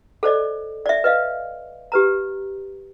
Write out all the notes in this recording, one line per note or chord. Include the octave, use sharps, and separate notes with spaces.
A4 C5 D5 D#5
D5 E5
B4 D#5 F5
G4 B4 A#5